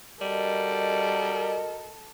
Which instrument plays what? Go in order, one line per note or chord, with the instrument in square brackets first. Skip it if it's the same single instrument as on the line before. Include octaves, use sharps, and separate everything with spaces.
[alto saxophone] G3 [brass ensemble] F#4 A#4 D#5 [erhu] A4